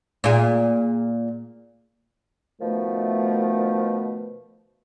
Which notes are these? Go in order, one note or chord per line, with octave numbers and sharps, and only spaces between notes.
A#2 G#4
B2 D#3 F3 A3